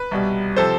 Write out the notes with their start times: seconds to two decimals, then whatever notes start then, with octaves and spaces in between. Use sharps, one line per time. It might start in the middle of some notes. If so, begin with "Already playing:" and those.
Already playing: B4
0.11 C2 B2 G3
0.56 C3 F3 A4 C5